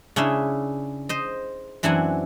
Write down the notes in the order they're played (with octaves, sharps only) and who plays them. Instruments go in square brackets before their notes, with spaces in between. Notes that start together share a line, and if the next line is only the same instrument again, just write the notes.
[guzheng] C#3 C#4 D4 E4 E5
C5 D#5
F#2 E3 C4 D4 F#5 G#5